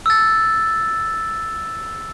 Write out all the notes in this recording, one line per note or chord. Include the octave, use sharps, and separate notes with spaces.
E6 A6